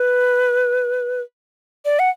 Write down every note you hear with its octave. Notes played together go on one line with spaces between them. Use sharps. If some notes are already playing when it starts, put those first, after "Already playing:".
Already playing: B4
D5
F#5